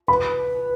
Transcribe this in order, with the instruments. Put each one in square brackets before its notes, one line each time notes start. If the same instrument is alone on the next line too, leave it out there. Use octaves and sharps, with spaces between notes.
[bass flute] B4 [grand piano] B5